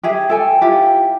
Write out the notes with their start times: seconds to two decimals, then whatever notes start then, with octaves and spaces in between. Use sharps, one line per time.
0.03 G4 G#4 E5
0.30 A4 G5 G#5
0.61 E4 F4 G4 G5